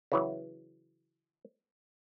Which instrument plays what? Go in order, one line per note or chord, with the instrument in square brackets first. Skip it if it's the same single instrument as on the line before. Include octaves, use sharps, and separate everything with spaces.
[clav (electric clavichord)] C#3 E3 F#3